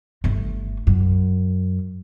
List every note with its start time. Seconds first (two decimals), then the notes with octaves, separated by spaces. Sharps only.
0.24 G1 A3
0.87 F#2